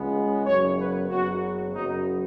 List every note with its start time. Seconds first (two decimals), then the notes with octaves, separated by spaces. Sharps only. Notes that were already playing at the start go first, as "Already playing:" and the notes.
Already playing: C#2 C#3 G#3 B3
0.45 F#1 F#2 F#3 B3 C#5
0.77 B4
1.10 F#1 F#2 C#3 F#3 B3 F#4
1.74 F#1 F#2 F#3 B3 D#4